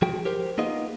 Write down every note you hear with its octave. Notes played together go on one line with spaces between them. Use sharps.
F3 F#4 G#4 G5
G4 A#4 C5
A#3 B3 D#4 F4 G#4 D#5